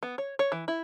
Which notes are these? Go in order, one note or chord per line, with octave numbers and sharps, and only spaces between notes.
B3
C#5
C#5
E3
E4